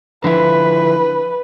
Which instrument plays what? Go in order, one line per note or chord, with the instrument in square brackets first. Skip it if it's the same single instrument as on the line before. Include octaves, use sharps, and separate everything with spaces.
[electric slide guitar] D3 F3 E4 [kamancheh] B4